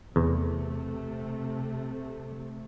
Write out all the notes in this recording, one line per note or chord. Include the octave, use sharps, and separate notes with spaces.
E2 C3 A3